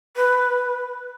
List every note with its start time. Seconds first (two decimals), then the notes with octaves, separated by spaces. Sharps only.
0.16 B4